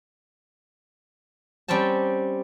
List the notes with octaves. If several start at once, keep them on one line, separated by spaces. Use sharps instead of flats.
G3 C4 C#4 G5 A5